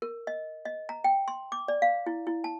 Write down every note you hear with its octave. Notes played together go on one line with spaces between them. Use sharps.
A#4
D#5
D#5
A#5
G5
C6
D6
D5
F5
E4
E4
A5